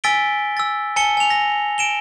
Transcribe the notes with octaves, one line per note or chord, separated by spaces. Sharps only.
G#5 E6 A6 B6 D7 G7
E6 A6
G#5 A5 C#7 G7
G#5 F7
A#6
D7 E7 G7